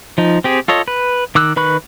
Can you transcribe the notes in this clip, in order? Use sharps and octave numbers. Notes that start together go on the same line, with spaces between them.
F3 D#4
C4 G4 G#4
F4 A4 C#5 D#5
B4
D#3 D6 E6 F#6
D#3 B4 B5 C#6 F#6